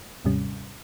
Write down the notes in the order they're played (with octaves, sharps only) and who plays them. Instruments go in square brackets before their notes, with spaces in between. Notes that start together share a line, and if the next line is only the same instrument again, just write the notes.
[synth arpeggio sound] D#2 G#2 C3 G3 C#4